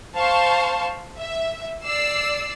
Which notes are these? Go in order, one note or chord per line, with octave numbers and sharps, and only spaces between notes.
C5 F5 A5 C#6
E5
D5 E6 C7